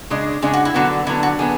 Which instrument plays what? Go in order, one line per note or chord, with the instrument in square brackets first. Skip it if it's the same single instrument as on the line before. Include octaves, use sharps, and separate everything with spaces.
[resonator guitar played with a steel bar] C#3 G#3 D4
[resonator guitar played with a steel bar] C#3 G#3 D4 [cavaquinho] G#4
[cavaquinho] F#4
E4
[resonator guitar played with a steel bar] D3 F#3 B3 [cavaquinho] F#4
[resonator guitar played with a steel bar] D3 F#3 B3 [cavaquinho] E4
[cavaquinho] F#4
[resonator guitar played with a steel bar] D3 F#3 B3 [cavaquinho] G#4